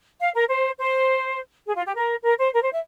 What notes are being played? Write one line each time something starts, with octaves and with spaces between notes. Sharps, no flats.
F5
A#4
C5
C5
G#4
F4
G4
A#4
A#4
C5
A#4
C5
E5